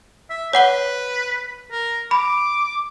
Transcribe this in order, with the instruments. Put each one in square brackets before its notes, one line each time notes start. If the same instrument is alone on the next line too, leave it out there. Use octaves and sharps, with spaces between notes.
[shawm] E5
[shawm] B4 [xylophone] C#5 F#5 G7
[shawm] A#4
[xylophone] B5 [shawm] D6